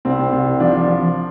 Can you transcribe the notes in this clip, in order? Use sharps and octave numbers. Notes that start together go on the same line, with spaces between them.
C2 C4
C2
F3 D4
F3